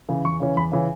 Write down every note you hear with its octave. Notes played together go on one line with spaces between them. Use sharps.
C#3 E3 C#4
E2 C#6
C#3 E3 C#4
E2 B5
C#3 E3 C#4